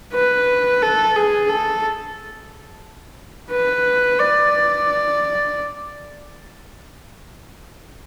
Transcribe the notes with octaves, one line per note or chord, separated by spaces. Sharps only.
B4
A4
G#4
A4
B4
D5